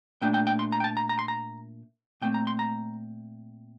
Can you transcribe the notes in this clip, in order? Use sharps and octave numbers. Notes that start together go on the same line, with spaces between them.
A#2 A3 D4 G5
G5
G5
C6
A#5
G5
A5
A#5
A#5
C6
A#5
A#2 A3 C4 G5
A#5
C6
A#5